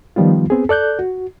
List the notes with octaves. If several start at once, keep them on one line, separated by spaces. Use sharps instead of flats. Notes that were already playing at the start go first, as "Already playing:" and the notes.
D#3 F3 G3 B3 F4
B3 C4 G#4
A4 D5 F#6 G6
F#4